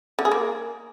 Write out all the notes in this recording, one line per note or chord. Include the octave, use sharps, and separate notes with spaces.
D3
G#4
A#3